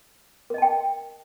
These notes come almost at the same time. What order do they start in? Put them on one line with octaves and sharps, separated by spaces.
A#4 D#5 A5 G5